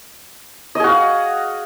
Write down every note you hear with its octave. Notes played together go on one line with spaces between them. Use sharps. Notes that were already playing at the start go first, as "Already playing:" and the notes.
F#4 G#4 D#5 F5